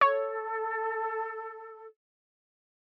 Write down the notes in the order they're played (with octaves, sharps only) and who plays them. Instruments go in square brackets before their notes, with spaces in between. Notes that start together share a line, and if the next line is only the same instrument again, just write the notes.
[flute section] A4 [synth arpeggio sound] C#5